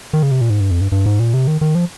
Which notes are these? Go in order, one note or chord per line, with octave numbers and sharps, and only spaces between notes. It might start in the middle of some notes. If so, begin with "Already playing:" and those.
D#3
C#3
C3
A#2
G#2
G2
F2
G2
G2
G#2
A#2
C3
D#3
D#3
F3